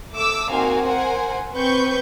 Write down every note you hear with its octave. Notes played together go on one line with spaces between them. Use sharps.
A3 D6 E6
A#3 C4 D#4 F#4 F5 G#5
A#4 C5 F#5 G#5
C4 B4 C#6 G6